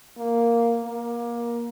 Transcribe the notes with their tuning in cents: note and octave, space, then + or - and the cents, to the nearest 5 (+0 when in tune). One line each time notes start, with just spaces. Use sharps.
A#3 +0
A#3 +20